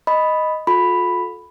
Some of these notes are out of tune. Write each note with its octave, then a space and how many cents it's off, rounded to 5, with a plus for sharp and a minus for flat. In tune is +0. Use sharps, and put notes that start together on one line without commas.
D#5 +0 B5 +0
F4 +40 A4 -15 B5 +0